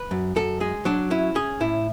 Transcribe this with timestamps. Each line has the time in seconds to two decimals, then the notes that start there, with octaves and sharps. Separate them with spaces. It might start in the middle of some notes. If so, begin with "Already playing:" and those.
Already playing: B4
0.11 F#2
0.36 F#2 A4
0.60 G#3 G#4
0.85 F#3 D4
1.10 C#4 E4
1.35 C#4 G#4
1.60 A2 E4